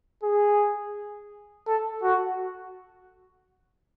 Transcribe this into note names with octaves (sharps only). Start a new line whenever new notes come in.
G#4
A4
F#4